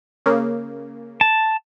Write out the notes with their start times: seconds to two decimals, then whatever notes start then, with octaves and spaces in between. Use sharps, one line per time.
0.26 C#3 A#3
1.21 A5